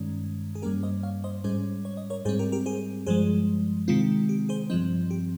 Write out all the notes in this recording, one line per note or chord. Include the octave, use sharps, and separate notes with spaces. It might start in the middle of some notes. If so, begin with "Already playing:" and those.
Already playing: G2 D#3 G#3 C#4
G#4
G2 G3 A#3 C#4 G4 A#4
C5 D#5
C#5 F5
C5 D#5
G#2 G3 C#4 G#4 C5
C#5
D#5
A#4 C#5
G#2 G3 C4 G#4 C5
G4 A#4
G4 A#4
G#4 C5
G2 F3 G#3 G#4 C5
C3 D#3 G#3 C4 F4
G4
G#4 C5
G2 F3 C4 C5 D#5
G4